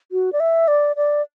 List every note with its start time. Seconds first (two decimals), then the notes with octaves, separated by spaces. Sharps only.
0.12 F#4
0.33 D5
0.40 E5
0.68 D5
0.96 D5